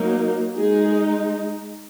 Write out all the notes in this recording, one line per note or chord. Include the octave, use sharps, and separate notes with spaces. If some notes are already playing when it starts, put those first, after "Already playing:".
Already playing: F#3 A#3 D#4
G#3 D#4 G#4